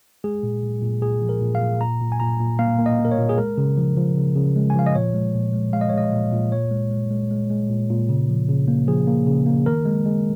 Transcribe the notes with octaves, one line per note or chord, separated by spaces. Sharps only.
G#3 G#4
A#2
A#2
A#2
A#2 G#4
F3
A#4
A#2
F5
A#2
A#2 A#5
A#2
G#5
A#2 A#5
A#2
A#3 F5
A#3
D#5
A#3
A#4
C#5
A#2
G#4
G#3 A#4
C#3
F3
F3
C#3
C#3
G#3
G#5
F3 F5
D#5
A#2 C#5
G#3
A#2
G#3
G#3 F5
D#5
C#5
G#3 D#5
A#2
A#2
A#2 C#5
G#3
G#3
G#3
G#3
G#3
A#2
A#2
C#3
F3
C#3
A#3
F3 G#4
A#3
C#3
A#3
D#3 A#4
G#3
G#3